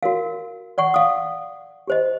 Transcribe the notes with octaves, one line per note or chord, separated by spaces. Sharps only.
F#4 A#4 F5
D5 F#5 C#6
F5 D#6
G4 C5 D#5